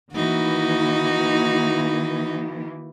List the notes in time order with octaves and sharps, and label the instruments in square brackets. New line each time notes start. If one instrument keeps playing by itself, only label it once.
[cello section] D#3 E3 A#3 [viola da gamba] D#4 F#4